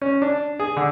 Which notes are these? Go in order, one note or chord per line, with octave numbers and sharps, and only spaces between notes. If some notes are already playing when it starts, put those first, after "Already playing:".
C#4
D4
G#4
D3